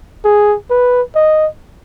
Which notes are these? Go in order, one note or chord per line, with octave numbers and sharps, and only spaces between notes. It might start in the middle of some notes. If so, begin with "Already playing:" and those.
G#4
B4
D#5